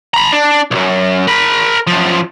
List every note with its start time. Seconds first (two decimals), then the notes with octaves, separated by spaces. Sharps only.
0.14 A#5 B5
0.32 D4
0.71 B1 F#2
1.28 A#4 B5
1.87 F#2 F3